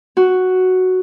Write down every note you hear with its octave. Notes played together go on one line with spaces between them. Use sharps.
F#4